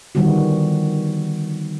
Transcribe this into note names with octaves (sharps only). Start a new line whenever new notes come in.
D3 D#3 F3 G3 B3 F#4